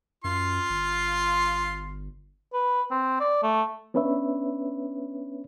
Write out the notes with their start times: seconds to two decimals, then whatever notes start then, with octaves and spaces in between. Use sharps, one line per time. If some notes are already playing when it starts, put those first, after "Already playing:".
0.24 F#2 F4 C6
0.70 G1
2.53 B4
2.91 C4
3.20 D5
3.43 A3
3.94 B3 C#4 D4 B4 C#5 E5